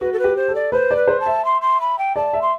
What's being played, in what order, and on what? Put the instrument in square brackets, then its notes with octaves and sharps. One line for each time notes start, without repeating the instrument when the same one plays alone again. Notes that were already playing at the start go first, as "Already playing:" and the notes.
[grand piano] F#4 [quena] B4
[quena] A4
B4
[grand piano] G4
[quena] C5
[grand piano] A4
[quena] D5
[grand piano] B4 [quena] C5
[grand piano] D5
[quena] B4
[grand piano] C5
[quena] A5
[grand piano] E5
[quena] C6
C6
B5
G5
[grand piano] D5 [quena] A5
[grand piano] E5
[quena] C6